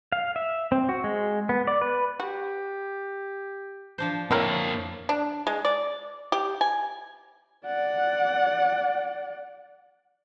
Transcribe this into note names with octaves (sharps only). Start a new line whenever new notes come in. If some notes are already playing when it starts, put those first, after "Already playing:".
F5
E5
C4
F#4
G#3
B3
D5
B4
F#4 G4
F3 D4 C5
A#3 C4 E4 A#4 C#5 F5
D4
G#3
D5
G4
G#5
D5 F#5